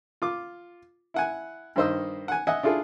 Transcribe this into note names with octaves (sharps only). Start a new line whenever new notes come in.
F4 D6
E4 F#5 G#5
G2 D#3 C5 D#5 E6
F#5 G#5
D#5 E5 F#5 G#5
D4 E4 F4 G#4 A4